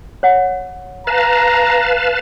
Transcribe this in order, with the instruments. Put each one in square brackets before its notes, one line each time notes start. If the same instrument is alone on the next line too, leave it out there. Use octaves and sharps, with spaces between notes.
[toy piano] C#5 F#5
[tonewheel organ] B4 F5 A5 [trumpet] A#5